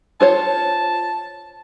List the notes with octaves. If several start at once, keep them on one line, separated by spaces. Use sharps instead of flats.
F4 C5 C#5 A5